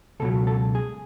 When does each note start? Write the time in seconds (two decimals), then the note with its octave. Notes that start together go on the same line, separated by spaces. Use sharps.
0.20 C#2 B2 F#3 A4
0.47 A4
0.75 G#4